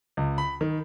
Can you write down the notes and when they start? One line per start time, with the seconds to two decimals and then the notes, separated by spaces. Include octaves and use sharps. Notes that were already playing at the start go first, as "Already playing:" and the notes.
0.17 C#2
0.38 B5
0.61 D#3